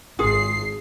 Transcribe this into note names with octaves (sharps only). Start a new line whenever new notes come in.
G#1 F4 G#4 C7